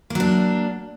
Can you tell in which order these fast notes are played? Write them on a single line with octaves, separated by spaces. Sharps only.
A#3 F#3 D4